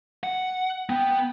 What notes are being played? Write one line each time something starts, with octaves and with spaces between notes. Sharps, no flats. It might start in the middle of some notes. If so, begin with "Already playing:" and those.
F#5
B3 G5